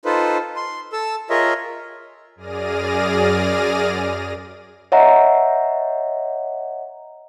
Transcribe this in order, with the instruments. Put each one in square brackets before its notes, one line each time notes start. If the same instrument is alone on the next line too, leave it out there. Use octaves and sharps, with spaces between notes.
[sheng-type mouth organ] D#4 F4 A4 B4 C5
C6
A4 E6
F4 G#4 A#4 C#5 D#5 E5
[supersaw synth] F#2 G#4 D5 F6 A#6 D#7
[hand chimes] C#5 D#5 E5 F#5 A#5